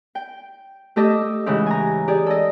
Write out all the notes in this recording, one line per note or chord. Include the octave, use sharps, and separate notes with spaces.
G5
A3 G4 A4 D#5 D6 E6
G#2 C#3 E3 C#4 G4
G#5 A#5
G4 G#4 D5
A4 D#5